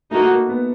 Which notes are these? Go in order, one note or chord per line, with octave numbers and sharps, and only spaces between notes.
A3 A#3 D#4 F#4
A#3
B3